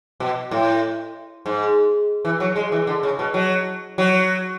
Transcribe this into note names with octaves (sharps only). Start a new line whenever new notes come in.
B2
A2
G#2
E3
F#3
G#3
E3
D3
C#3
B2
F#3
F#3